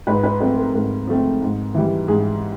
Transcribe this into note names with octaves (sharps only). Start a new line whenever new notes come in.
G#2 B4
B4
F3 A3 C4 B4
A#4
G#2 A#4
F3 A3 C4
G#2
E3 G3
G#2 G#4